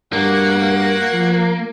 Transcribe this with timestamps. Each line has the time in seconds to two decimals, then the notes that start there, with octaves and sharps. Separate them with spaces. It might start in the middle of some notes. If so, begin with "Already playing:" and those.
0.13 G2 A#3 F#4 F#5
1.13 F3